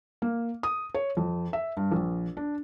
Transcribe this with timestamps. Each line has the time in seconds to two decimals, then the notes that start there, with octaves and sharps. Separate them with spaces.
0.22 A#3
0.63 D#6
0.94 C#5
1.17 F2
1.53 E5
1.77 G2
1.91 A#1
2.37 D4